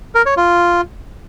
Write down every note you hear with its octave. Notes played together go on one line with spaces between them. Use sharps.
A#4
C#5
F4